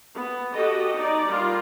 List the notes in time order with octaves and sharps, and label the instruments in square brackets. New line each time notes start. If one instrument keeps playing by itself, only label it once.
[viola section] B3
F#4 G4 A4 D#5
D#4 D5
G3 F4 A#4